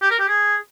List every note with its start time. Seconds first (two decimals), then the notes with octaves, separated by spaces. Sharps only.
0.02 G4
0.11 A#4
0.19 G4
0.28 G#4